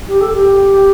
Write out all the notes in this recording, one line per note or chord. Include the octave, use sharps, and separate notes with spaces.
G4
A4
G4